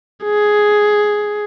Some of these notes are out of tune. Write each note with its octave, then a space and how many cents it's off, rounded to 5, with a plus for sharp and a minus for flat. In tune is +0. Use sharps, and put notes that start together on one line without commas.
G#4 +5